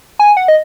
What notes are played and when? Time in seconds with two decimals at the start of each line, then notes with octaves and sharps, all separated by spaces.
0.19 G#5
0.37 F#5
0.48 D#5